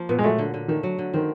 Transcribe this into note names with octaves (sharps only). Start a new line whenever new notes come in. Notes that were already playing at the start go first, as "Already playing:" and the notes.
Already playing: F3 A#3
A#2 B3
G#3
F#3 A3
D3
D3
D#3 A3
F#3
D3
D#3 C4